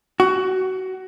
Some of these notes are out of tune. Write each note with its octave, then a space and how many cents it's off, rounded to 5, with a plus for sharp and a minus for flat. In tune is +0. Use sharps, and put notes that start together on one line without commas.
F#4 +20